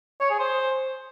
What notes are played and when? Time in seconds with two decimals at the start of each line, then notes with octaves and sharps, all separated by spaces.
0.20 C#5
0.30 G#4
0.39 C5